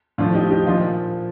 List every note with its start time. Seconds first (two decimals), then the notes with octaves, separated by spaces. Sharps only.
0.18 A2 F3 D4 F4
0.35 D#4 G4
0.51 D#4 G4
0.67 A#2 F3 D4 F4